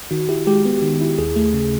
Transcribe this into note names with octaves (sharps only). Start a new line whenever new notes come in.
D#3 F#4
E4 G4
G#3 G4
B3
D#3
E4
D#2 G#4
A3
G#4
C#3